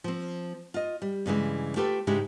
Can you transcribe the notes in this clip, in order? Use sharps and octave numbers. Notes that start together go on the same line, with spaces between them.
F3 C4
F4 D#5
G3
G2 C#3 E3 G#3
A3 F4 G4 A4 B4
G#2 C#3 G#3 D4 E4 G4